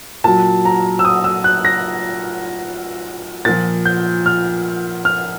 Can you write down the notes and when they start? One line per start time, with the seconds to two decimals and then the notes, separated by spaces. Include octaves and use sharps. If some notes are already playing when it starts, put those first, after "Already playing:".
0.24 A#2 F#3 A5
0.65 A#5
0.99 E6
1.05 D#6
1.24 E6
1.44 F#6
1.65 A#6
3.45 A#2 F3 A6
3.85 G6
4.26 F6
5.05 F6